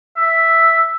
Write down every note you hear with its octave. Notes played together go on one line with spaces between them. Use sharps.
E5